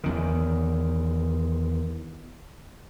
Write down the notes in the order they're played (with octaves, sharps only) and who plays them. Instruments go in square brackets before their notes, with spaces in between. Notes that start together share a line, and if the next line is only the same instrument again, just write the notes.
[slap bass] E2 D#3